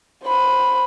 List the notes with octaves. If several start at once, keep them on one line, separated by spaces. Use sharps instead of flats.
C5 B5